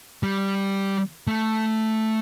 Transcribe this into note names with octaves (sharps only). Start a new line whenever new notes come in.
G3
A3